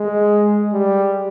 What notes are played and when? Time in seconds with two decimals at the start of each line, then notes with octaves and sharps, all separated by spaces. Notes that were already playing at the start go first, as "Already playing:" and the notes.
Already playing: G#3
0.73 G3